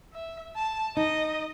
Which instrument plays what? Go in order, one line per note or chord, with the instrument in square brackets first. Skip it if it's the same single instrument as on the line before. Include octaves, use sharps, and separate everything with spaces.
[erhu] E5
A5
[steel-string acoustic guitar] D#4 [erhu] D#5